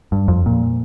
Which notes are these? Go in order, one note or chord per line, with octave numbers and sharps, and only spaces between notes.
G2
F2
A#2